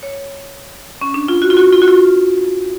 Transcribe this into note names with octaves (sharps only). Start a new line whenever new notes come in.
C#5
C#4
D4
F4
F#4
F4
F#4
F4
F#4
F4